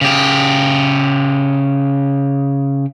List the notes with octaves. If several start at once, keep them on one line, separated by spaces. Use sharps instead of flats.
C#3 G4